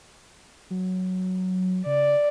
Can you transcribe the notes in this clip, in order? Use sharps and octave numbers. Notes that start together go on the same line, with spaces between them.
F#3
C#3 D5